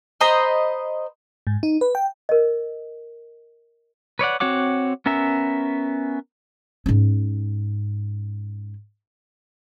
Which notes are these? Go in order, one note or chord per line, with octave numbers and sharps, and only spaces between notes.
C5 D#5 A#5 B5
G#2
D#4
B4
G5
A#4 D#5
B4 C#5 D5 F#5
C4 F#4 C#5 F#5 D6
B3 C#4 A#4 E5
G#2 C#4